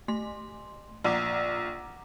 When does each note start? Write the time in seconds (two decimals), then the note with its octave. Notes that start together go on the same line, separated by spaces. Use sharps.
0.08 A3 C6
1.04 A#1 F#5 A#5 D6